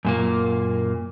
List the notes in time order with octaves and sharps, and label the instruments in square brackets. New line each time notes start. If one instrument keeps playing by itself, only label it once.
[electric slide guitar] F#2 A#2 A#3